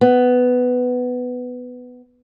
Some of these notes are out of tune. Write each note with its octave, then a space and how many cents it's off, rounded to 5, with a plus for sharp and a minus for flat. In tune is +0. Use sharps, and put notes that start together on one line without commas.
B3 +10